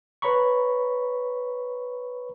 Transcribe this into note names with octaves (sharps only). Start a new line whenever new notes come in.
B4 C#5 A#5 B5 C#6